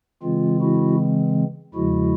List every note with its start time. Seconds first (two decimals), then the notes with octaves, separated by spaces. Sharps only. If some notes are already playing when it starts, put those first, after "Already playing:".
0.22 C#3 E3 G#3 C4 F4
0.61 E4 F#4
1.74 E2 C#3 F3 G#3 E4 F#4